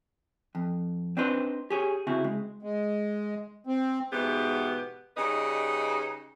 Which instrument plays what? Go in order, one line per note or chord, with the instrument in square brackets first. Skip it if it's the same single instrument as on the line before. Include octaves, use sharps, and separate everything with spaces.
[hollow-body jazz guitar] F2
C4 D4 D#4 B4 C5
G4 G#4 C#5
C#3 C4 E4 F#4
G#3
[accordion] G#3
C4
[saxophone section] G#2 B2 E3 B3 G4
C#3 G3 D#4 B4 D#5